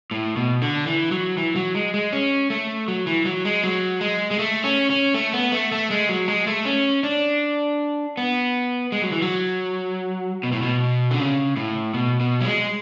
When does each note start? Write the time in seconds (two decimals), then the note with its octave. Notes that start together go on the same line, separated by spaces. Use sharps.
0.11 A2
0.36 B2
0.62 D3
0.87 E3
1.12 F#3
1.37 E3
1.56 F#3
1.75 G#3
1.94 G#3
2.13 C#4
2.50 A3
2.88 F#3
3.07 E3
3.25 F#3
3.45 G#3
3.64 F#3
4.01 G#3
4.31 G#3
4.39 A3
4.64 C#4
4.90 C#4
5.14 A3
5.33 B3
5.52 A3
5.72 A3
5.91 G#3
6.09 F#3
6.28 G#3
6.47 A3
6.65 C#4
7.03 D4
8.17 B3
8.92 G#3
9.02 F#3
9.12 E3
9.22 F#3
10.43 B2
10.52 A2
10.62 B2
11.11 D3
11.19 C#3
11.56 A2
11.94 B2
12.20 B2
12.41 F#3
12.45 G#3